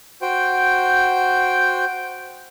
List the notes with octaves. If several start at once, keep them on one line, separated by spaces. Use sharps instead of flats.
F#4 C5 G5